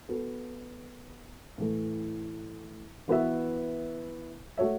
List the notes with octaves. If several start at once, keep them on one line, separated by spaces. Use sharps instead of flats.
B3 F#4 A4
A2 E3 A3
E3 B3 F#4 B4 E5
A3 F#4 C#5 E5